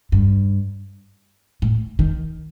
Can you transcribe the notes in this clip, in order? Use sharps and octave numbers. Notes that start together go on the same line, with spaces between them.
G2
A2
D#3